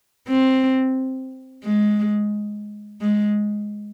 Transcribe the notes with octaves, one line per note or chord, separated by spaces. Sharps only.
C4
G#3
G#3